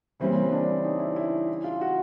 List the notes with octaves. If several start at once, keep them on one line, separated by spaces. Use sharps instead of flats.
C#3 E3 G3 A#3 C4 C#4
D4
D#4
E4
E4
E4
F4
F#4